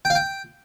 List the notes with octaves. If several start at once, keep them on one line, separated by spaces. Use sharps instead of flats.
G5
F5
G5